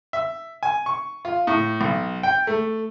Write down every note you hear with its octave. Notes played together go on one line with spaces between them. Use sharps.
E5
G#5
C#6
F4
A2
B1
G5
A3